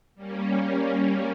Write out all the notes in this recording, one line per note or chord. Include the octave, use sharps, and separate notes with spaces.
G3 A#3 C#4